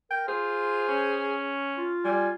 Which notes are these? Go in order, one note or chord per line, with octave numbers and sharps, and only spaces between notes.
A#4 G5
F4 G#4 C5
C#4
F4
G3 G#5